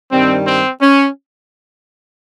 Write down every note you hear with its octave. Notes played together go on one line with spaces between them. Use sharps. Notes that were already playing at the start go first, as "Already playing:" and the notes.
G2 D#3 G3 C4
C4
C#4